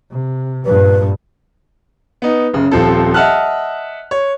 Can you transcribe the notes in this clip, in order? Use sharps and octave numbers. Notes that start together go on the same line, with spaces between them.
C3
G2 A#2 B4
B3 D#4
F#1 C#3
D#1 F3 C4 A4
D#5 E5 F#5 A5 F6 F#6
C#5